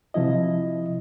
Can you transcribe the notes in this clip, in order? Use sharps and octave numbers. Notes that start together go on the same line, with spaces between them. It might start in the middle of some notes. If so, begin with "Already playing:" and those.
C3 F3 E4 D#5